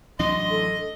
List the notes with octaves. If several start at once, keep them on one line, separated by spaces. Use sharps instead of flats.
A1 F#3 D4 D#5 C6
A4